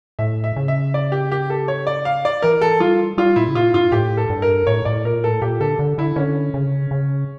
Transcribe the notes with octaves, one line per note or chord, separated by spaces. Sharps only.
A2 E5
E5
C#3
E5
D5
G4
G4
A4
C#5
D5
F5
D5
E3 A#4
A4
G3 F4
G3 F4
A#2 E4
C#3
A#2 F4
G2 F4
A2 G4
A4
G2
A#4
A2 C#5
A2 D5
A#2 A#4
A2 A4
A#2 G4
D3 A4
D3
D3 E4
D3 C#4
C#3
C#3